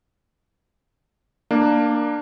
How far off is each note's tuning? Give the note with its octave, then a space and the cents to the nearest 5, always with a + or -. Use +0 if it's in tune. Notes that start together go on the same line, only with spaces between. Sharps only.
A#3 +0 D4 +15